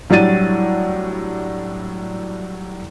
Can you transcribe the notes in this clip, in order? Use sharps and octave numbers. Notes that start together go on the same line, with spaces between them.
A2 F#3 G3 D4 A6 D#7